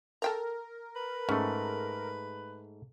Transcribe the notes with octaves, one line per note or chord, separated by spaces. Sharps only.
A4 A#4 G5 A#5
B4
G#2 A3 C#4